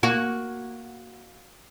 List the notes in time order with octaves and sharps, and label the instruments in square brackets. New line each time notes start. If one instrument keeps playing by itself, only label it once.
[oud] A#3 F#4